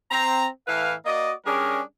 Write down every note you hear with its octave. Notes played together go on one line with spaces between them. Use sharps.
C4 A#5
A2 E3 E4 B4 F5
A#3 F#4 D5 D#5
G3 C#4 D4 G#4 A#4